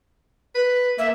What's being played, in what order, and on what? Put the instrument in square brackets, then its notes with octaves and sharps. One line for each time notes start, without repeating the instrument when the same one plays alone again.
[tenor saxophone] B4
[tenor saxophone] A#3 [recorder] E5